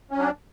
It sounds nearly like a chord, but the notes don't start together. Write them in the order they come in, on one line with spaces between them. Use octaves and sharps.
C#4 F#3 D4